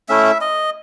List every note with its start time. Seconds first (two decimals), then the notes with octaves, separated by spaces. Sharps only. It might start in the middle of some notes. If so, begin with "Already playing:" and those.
0.09 A3 C#4 E4 E5
0.41 D#5